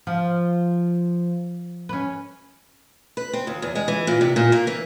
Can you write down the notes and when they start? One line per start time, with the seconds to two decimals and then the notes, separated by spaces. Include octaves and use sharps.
0.07 F3
1.89 C#4 B4
3.17 B4
3.33 C4
3.47 D#2
3.62 E2
3.75 G#3
3.88 E3
4.07 A#2
4.21 C3
4.36 A#2
4.52 A#3
4.67 E3